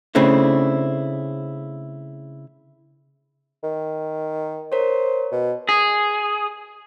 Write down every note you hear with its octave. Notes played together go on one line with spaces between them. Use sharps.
C#3 A3 C4 D4 E4
D#3
A#4 C5 C#5
B2
G#4